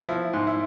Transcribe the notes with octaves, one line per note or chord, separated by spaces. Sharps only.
F3 E4
G#2
E4